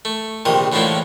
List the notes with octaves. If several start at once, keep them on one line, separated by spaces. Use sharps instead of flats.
A3
A#1 C3 D#3 D#6
A2 D3 E3 F3 A3 A#3